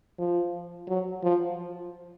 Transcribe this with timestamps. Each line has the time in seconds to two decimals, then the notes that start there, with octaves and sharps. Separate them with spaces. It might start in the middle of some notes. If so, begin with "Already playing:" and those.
0.18 F3
0.88 F#3
1.23 F3